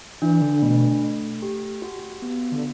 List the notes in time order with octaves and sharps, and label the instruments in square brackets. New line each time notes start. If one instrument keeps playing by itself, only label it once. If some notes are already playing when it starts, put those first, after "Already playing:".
[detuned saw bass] E3 [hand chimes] D4
[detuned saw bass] D3
[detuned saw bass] B2 [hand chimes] A3
[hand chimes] A3
G4
F#4
B3
[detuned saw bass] D3